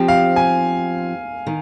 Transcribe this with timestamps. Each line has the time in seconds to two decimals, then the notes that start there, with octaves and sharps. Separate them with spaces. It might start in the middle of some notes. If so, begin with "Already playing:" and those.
Already playing: F3 C4 G4
0.08 F5
0.36 G#5
1.47 D#3